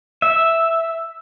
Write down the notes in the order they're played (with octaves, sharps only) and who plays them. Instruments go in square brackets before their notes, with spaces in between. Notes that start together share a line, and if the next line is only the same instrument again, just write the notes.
[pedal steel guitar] E5